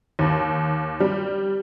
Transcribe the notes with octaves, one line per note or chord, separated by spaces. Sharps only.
D#2
G3